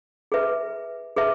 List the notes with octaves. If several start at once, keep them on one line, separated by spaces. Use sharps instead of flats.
G#4 B4 E5
G#4 B4 E5